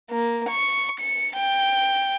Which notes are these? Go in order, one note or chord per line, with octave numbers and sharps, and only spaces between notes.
A#3
C#6
C#7
G5